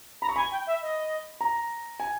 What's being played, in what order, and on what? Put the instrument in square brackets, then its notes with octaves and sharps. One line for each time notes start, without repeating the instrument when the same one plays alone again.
[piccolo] A#5 [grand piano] B5
[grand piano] C#6
[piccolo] G#5 [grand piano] B5
[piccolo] G5
E5
D#5
[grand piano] A#5
G#5